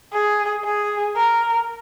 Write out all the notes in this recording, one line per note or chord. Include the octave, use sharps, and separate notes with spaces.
G#4
G#4
A#4